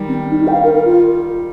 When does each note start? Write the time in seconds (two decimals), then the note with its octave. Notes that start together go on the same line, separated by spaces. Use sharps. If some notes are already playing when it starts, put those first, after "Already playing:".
Already playing: D#3 G3
0.09 C4
0.20 C4
0.31 D#4
0.41 D#4
0.47 G5
0.52 F5
0.63 A#4
0.74 A#4
0.85 F4